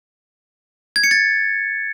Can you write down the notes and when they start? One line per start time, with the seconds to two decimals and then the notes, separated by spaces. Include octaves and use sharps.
0.96 G#6
1.04 C#7
1.11 A6